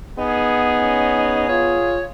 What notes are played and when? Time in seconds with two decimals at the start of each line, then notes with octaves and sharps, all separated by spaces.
0.18 B3 D#4 G#4
0.79 C#4
1.49 F4 C#5